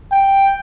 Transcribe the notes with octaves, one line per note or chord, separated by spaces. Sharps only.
G5